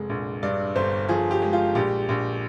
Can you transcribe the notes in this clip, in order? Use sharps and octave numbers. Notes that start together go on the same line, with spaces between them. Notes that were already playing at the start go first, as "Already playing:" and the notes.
Already playing: F1 G#3
A#1
G2 D5
G1 C5
F3 G#4
G4
G#3
F4
A#1 G4
A#1